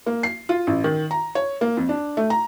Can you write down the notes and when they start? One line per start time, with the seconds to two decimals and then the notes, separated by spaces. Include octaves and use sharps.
0.06 A#3
0.23 C7
0.49 F4
0.67 A1
0.84 D#3
1.11 A#5
1.35 C#5
1.61 A#3
1.77 F2
1.89 D4
2.17 A3
2.30 A#5